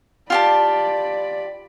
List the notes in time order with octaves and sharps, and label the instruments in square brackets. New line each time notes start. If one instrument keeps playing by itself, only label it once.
[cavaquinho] F4 G4 A5 [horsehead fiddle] D5 B5